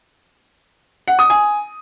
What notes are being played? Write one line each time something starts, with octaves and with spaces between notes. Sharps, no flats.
F#5
D#6
G#5